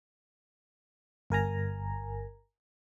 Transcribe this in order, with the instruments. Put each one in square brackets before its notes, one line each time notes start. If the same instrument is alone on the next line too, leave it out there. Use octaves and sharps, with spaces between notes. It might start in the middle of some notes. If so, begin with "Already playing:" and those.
[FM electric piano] G1 A#4 G#5 A#5